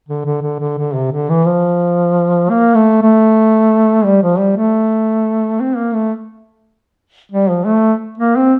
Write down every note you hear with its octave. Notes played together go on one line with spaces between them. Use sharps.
D3
D3
D3
D3
D3
C3
D3
E3
F3
A#3
A3
A3
G3
F3
G3
A3
C4
A#3
A3
G3
F3
A3
A#3
C4